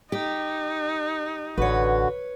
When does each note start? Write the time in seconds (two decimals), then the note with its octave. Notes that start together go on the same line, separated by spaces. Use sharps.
0.12 D#4 G4
1.58 A1 D3 F#4 B4 C#5